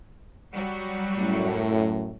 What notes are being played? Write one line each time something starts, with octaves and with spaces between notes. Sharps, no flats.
F#3 G3 F#4
F#2 A2